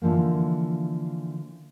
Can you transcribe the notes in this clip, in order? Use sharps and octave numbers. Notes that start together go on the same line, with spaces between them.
D3 E3 F3 A#3